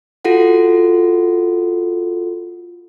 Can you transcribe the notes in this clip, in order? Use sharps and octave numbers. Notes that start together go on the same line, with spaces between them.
F4 F#4 A4 F#5